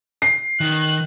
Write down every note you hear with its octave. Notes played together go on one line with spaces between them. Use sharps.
C7
D#3 F#6